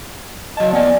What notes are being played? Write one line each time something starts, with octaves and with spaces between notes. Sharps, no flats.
F#3 D#5 A5
B3 D5 G#5